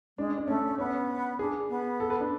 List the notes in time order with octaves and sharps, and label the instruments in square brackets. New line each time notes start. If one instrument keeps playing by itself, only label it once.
[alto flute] G#3 [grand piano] D4
[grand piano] D4
[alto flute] A3 [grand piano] C#4
[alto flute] B3 [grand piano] C#4
[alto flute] D4 [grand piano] G#4
[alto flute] B3
[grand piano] A4
B4
D4